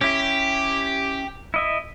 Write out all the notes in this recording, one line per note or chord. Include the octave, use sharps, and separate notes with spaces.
C#4 E4 G4
E4 D#5 E5